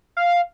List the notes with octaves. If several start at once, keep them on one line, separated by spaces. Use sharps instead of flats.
F5